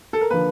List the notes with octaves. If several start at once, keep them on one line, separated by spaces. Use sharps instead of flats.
A4
A#4
D3 F3 A#3 B4